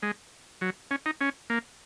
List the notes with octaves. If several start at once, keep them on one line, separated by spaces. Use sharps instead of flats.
G#3
F#3
C#4
D#4
C#4
A#3